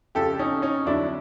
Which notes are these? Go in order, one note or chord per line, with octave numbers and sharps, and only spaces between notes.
F2 C#3 F3 G4 A4
C#4 D#4
C#4 D#4
F2 D3 F#3 D4 E4